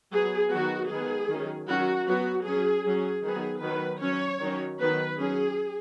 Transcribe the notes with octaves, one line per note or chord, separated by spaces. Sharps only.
F#3 B3 G#4
D#3 F#3 B3 F#4
D#3 G#3 B3 G#4
D#3 F#3 C#4
D#3 F#3 C#4 F#4
F#3 B3 F#4
F#3 C#4 G#4
F#3 C#4 G#4
D#3 F#3 B3 G#4
D#3 F#3 B3 B4
F#3 C#4 C#5
D#3 F#3 C#4
D#3 F#3 B3 B4
F#3 C#4 G#4